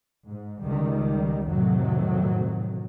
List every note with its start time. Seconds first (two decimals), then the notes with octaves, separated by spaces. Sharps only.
0.28 G#2
0.62 C#2 D#3 G3
1.49 F2 A2 C3 D#3 F#3